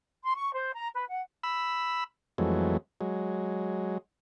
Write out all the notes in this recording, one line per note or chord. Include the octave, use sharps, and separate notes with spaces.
C6
C#6
C5
A#5
B4
F#5
B5 E6
F2 E3 F#3 G#3 A3
F#3 G#3